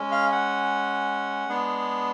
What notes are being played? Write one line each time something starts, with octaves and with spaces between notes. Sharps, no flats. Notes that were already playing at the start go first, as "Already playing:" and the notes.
Already playing: G#3 C#4
F5
F#5
G#3 B3 D4 G#4